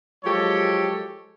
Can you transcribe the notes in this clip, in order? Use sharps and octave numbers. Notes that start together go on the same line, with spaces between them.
F3 F#3 G#3 G4 A4 C#5